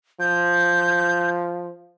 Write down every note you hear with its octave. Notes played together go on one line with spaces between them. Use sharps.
F3 G6